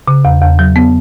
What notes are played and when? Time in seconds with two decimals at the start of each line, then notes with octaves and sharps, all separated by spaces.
0.08 C#3
0.25 E2
0.42 E2
0.59 F#3
0.76 B3